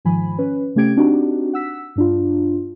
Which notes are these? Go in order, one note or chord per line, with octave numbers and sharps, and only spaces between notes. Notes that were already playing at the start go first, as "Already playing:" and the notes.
G#2 D#3 F3 G#5 B5
C#4 B4
C3 A3 C#4 G4 G#6 D7
C4 D4 D#4 F#4 G4
F#5 E6 B6
G2 D4 F4